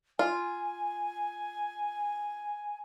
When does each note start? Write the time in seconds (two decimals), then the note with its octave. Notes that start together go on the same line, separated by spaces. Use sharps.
0.19 F4 G#5